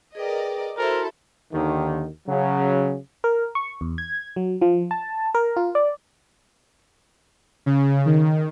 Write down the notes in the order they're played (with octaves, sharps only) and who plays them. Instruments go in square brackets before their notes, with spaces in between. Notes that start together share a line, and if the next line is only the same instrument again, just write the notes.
[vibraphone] G#4 B4 G5 [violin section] A#4 D5 D#5
[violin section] E4 A4 C5 [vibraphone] F#4 C6 [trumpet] A#4
[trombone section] D#2 D3 D#3
C#3 F#3
[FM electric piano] A#4
C#6
E2
G#6
F#3
F3
A5
A#4
F4
D5
[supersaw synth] C#3
D#3